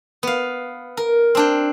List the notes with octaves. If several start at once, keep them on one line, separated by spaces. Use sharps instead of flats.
B3 F5
A#4
C4 D4 G5